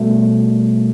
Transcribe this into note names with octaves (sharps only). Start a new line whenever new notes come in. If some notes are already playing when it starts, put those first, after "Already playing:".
Already playing: B2 G3 A3